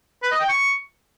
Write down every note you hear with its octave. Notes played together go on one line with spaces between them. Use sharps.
B4
D#5
G5
C#6